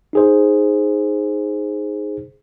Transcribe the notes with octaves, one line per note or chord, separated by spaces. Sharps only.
D#4 G#4 C5